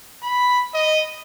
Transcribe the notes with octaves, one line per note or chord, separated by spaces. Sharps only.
B5
D#5